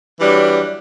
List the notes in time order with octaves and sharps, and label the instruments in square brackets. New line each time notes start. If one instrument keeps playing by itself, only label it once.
[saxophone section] E3 F#3 G3 D4